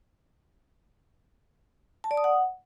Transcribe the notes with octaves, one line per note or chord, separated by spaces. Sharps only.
A5
D5
D#6
F#5